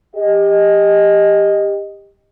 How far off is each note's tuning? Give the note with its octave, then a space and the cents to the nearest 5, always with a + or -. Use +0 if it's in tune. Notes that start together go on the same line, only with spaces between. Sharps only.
G4 +20 D#5 +0